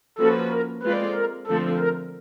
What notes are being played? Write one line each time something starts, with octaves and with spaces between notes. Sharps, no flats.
F3 A#3 C#4 F#4 A4 B4
A#4
G#3 C4 F4 A4 B4 D5
A#4
D3 F3 A3 C4 A4
A#4